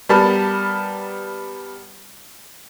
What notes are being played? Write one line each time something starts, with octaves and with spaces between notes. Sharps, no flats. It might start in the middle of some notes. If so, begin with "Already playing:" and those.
G3 B3 A#4 A5 B5 F6